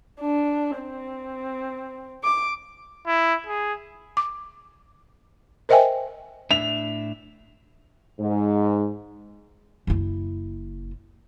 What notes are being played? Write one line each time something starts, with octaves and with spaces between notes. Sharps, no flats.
D4
C4
D6
E4
G#4
D6
A#4 C5 D#5 E5 G5 G#5
A2 D4 E5 F7
G#2
F#1 E4